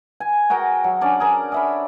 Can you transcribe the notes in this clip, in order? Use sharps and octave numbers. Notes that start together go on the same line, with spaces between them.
G#5
F#4 G#4 A#4 G5
F#3
C#4 D4 D5
G#4 A#4
G#4 E5 B5